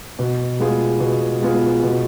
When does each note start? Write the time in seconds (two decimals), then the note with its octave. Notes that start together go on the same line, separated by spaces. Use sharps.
0.19 B2
0.60 G#3 B3 F4 G#4
1.00 B2
1.42 G#3 B3 F4 G#4
1.83 B2